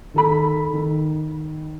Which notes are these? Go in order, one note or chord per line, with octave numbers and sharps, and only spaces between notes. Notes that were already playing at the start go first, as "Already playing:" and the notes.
D#3 A4 B5
D#3